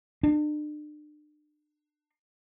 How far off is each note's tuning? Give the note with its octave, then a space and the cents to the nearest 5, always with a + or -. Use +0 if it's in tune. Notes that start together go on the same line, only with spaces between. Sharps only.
D4 +40